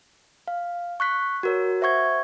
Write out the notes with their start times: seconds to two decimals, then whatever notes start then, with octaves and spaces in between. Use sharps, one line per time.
0.48 F5
1.00 C#6 F#6 B6
1.43 F#4 A#4 C#5
1.81 C5 E5 F#5 C#6 G#6